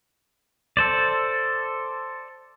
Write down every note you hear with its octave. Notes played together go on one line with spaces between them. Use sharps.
A4 C5 D5